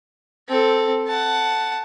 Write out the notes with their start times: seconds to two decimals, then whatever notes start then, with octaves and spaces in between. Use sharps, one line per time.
0.48 C4 A4
1.07 F#5 A5